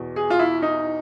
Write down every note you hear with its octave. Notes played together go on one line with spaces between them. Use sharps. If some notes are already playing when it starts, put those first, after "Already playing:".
Already playing: E2 B2
G#4
F4
E4
D#4